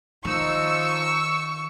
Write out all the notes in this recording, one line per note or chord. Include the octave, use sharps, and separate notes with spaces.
D#3 F3 D#4 C#6 E6